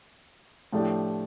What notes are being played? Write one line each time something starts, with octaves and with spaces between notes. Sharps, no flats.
A2 F3 A3 D4 G4